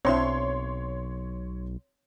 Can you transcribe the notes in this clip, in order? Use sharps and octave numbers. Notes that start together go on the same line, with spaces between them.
B1 C4 D4 E4 C#5 C6